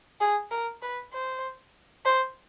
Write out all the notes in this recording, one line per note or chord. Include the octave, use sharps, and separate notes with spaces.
G#4
A#4
B4
C5
C5